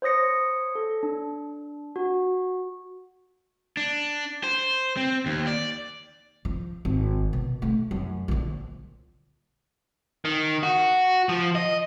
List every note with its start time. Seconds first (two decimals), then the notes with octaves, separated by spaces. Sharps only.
0.02 C5 C#5 D#6 A#6 C#7
0.75 A4
1.03 D4
1.96 F#4
3.77 D4
4.44 C5
4.97 C4
5.26 D#2
5.47 D5
6.45 F3
6.85 G#1
7.33 B2
7.62 A3
7.91 F#2
8.28 A#1 D3
10.25 D#3
10.63 F#4
11.29 F3
11.55 D#5